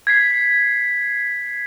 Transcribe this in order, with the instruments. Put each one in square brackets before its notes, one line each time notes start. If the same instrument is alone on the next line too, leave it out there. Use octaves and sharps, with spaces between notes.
[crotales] G#6 B6 C7